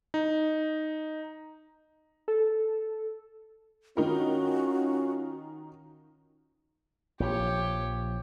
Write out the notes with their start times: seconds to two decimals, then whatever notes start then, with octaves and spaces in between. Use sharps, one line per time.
0.14 D#4
2.28 A4
3.97 D#3 C#4 D#4 F4 F#4 A#4
7.20 A#1 F3 G4 C#5